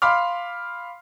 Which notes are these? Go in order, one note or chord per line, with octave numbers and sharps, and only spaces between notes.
F5 B5 C6 D6 F6